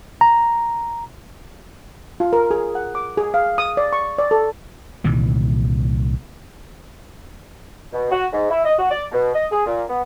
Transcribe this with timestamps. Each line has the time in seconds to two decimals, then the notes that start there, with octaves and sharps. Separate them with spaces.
0.21 A#5
2.20 F4
2.33 A#4
2.51 G#4
2.75 F#5
2.95 D6
3.18 G#4
3.34 F5
3.58 D#6
3.77 D5
3.93 C#6
4.18 D5
4.31 A4
5.04 C2 A#2 D#3 E3
7.93 B2
8.11 F#4
8.32 G#2
8.50 E4
8.65 D#5
8.78 F#4
8.90 D5
9.12 B2
9.34 D#5
9.51 G#4
9.66 A#2
9.88 B3